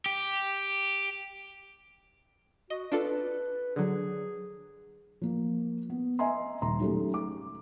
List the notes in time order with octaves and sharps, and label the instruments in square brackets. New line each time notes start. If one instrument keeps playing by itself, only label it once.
[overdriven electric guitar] G4
[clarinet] F#4 [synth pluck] D#5
[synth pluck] D4 F4 A4 [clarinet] B4
[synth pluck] D3 F#3 [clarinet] G#4
[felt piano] F3 A#3
B3
D#5 E5 G#5 A#5 C6
D#1 A#5 C6
D#3 F#3 G#3 A3 C#4 G4
D6